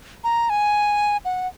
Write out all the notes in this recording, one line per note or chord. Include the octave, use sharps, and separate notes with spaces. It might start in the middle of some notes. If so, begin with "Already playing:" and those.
A#5
G#5
F#5